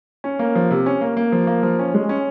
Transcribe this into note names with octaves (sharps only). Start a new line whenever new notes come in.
C#4
A#3
F3
C3
C#4
A#3
A#3
F3
A#3
F3
C#4
G#3
C#4